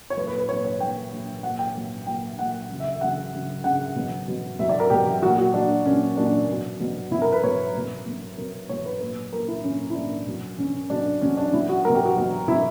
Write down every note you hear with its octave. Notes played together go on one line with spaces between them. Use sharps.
C#5
A#2 F#3 B4
B4
B4
A#2 F#3 C#5
C#5
A#2 F#3 G5
A#2 F#3
A#2 F#3 F#5
G5
A#2 F#3
A#2 F#3 G5
A#2 F#3 F#5
C#3 F#3
E5
E5
C#3 F#3 F#5
C#3 F#3
C#3 F#3 F#5
B2 F#3
B2 F#3
B2 F#3 E5
D5
A#4
B2 F#3 G4
G4
A#2 F#3 F#4
F#4
A#2 F#3 D4
A#2 F#3 C#4
A#2 F#3 D4
B2 F#3
B2 F#3
B2 F#3 E4
A#4
B4
B2 F#3 C#5
B2 F#3
B2 F#3
B2 F#3 A#4
B2 F#3 C#5
B4
A#2 F#3
A#2 F#3 A#4
E4
A#2 F#3 C#4
E4
A#2 F#3 D4
B2 F#3
B2 F#3 C#4
B2 F#3 D4
B2 F#3 C#4
D4
B2 F#3 E4
F#4
B2 F#3 A#4
G4
F#4
B2 F#3
B2 F#3 E4